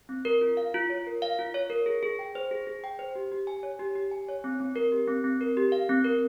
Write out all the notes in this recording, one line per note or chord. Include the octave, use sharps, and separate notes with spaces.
C4
A#4
F4
F5
F4
C#5
A#4
F5
F4
C#5
A#4
G#4
G#4
G5
C5
G#4
G#4
G5
C5
G4
G4
G#5
C#5
G4
G4
G#5
C#5
C4
C4
A#4
G4
C4
C4
A#4
G4
F5
C4
A#4